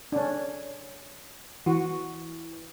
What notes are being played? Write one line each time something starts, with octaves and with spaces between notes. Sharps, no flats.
C#4 D4
E3 F#4